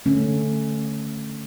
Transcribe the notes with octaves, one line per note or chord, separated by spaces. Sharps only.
D3 A3 C#4